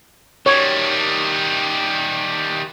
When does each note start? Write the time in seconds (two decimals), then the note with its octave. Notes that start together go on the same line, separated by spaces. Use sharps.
0.46 D#3 G3 C#5